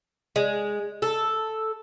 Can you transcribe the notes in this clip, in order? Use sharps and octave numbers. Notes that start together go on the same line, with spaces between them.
G#3
A4